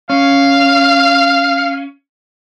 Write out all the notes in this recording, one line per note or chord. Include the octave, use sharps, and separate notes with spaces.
C#4 F5